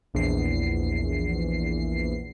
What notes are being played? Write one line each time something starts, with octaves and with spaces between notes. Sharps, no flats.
A#1 E2 C7